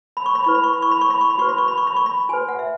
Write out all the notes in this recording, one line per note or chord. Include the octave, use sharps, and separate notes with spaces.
B5
C#6
B5
E4 B4 C#6
B5
C#6
B5
C#6
B5
C#6
B5
C#6
B5
F#4 B4 C#6
B5
C#6
B5
C#6
B5
C#6
B5
F#4 B4 G#5
F#5
E5